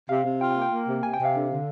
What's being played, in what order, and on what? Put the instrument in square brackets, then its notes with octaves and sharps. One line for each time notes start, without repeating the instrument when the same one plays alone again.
[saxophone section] C3 [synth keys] F5
[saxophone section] C3
[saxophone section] F4 [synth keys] G5
[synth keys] G5
[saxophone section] A#3
[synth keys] G5
[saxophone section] A#3
C3
[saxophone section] C3 [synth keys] G#5
[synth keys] G5
[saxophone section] C3
[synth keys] F5
[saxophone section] D3
D3